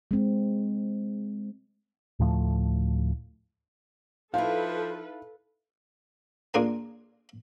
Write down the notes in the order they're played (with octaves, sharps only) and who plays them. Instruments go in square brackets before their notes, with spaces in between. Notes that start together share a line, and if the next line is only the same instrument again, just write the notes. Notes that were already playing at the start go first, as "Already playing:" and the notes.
[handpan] G#3 C4
[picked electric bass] D2 A2 F3 A3
[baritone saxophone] F3 [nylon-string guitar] D#4 E4 [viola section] A4 B4 [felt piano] F5
[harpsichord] A#3 D4 F4 G#4 A#4 G#5